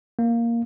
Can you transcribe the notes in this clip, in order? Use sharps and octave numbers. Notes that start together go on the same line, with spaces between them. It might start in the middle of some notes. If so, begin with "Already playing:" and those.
A#3